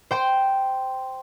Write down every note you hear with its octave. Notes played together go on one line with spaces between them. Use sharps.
C5 G5 C6